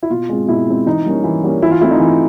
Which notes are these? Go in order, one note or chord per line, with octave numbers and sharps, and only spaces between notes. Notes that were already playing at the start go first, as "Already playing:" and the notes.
E4
B2 F4
G#3 C4
B2 E4
G#3 C4
E3 D#4
G3 A#3 C#4
E3
G3 A#3 C#4
E3 E4
F4
A3 C4 E4
D#4
E3